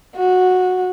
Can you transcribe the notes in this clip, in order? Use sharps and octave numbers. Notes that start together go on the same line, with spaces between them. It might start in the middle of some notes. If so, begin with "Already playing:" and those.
F#4